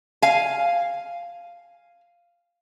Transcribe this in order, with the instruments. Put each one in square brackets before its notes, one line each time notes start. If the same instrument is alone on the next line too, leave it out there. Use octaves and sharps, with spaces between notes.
[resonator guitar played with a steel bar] F5 G#5